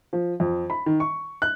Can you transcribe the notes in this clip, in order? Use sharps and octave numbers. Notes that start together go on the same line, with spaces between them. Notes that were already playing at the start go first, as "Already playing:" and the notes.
F3
F2
B5
D#3
C#6
F#6